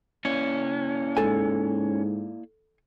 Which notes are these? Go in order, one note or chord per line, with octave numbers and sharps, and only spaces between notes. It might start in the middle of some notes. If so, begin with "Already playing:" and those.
A#3 C#4 E4 D5
G#2 A4 G#5